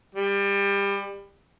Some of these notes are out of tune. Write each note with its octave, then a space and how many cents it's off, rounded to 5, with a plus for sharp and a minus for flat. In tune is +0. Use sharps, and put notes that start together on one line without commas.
G3 +25